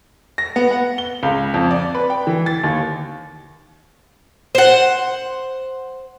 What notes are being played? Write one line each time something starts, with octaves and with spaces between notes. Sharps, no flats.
A#6
B3
F#5
G7
C#2
F2
D5
B4
G5
E3
A6
D#2
C5 F#5